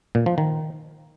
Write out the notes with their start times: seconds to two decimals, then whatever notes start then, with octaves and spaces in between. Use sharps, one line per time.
0.15 A#2
0.26 F3
0.38 D#3